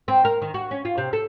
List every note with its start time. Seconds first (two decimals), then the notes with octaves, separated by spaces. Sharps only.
0.08 C4
0.25 A#4
0.42 D#3
0.54 F#4
0.71 C#4
0.85 F4
0.98 C3
1.13 A4